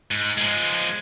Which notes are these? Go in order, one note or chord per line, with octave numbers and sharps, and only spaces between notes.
G#2
F3 G#3